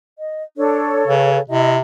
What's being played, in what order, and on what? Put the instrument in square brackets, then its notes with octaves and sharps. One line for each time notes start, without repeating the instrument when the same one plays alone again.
[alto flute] D#5
[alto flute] D4 [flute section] A4 C#5
[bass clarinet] C#3 [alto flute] B4
[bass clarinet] C3 [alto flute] E4 [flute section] D#5